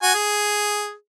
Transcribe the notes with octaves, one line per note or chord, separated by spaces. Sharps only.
F#4 G#5
G#4